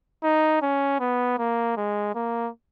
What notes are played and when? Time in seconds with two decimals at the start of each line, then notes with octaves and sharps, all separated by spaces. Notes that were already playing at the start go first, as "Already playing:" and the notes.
0.24 D#4
0.62 C#4
1.00 B3
1.39 A#3
1.77 G#3
2.15 A#3